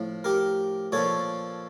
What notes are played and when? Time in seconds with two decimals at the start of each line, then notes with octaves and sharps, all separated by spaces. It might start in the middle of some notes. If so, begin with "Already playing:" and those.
Already playing: A2 F3
0.24 G4 A#4
0.92 A#2 F3 A4 C#5